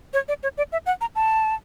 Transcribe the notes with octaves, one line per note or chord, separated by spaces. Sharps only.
C#5
D5
C#5
D5
E5
F#5
A#5
A5